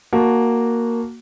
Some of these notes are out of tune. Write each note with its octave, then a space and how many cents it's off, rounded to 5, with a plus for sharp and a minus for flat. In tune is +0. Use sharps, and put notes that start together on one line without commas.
A#3 +0 F#4 +0 A5 -10